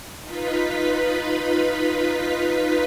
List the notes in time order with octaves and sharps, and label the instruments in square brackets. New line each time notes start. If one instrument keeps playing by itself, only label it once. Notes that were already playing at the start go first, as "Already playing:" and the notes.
[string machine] D#4 F4 B4 B5